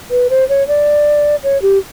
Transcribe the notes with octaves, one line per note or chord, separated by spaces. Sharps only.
B4
C5
C#5
D5
C#5
G4